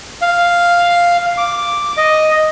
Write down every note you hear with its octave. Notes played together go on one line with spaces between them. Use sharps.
F5
D6
D#5